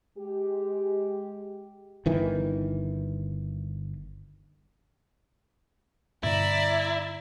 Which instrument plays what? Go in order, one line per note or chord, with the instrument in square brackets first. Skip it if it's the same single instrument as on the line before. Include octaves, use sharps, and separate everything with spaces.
[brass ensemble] G#3 G4
[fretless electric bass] G1 D#3 E3
[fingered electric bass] G2 B2 D3 [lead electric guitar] E4 [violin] D5 A#5